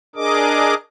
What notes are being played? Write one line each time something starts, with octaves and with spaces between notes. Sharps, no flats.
D4 G#4 A#4 D#5 D6